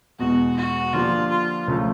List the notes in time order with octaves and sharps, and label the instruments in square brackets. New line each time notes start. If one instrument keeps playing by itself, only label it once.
[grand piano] E2 B2 G#3 [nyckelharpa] F#4
[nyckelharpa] F#4
[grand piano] D3 F3 A#3 D4 G4 [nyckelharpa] F4
[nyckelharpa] F4
[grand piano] C#2 C#3 F3 A3